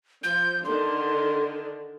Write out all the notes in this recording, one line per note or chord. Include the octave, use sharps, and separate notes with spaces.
F3 G6
D3 D#3 D4 C6